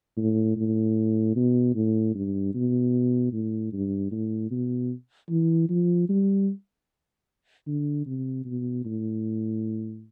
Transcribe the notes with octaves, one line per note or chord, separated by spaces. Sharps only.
A2
A2
B2
A2
G2
B2
A2
G2
A2
B2
E3
F3
G3
D3
C3
B2
A2